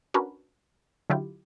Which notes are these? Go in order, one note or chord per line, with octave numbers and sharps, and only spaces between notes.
C#4 D4 F#4 A#4 B4
D3 F#3 E4 F4 G4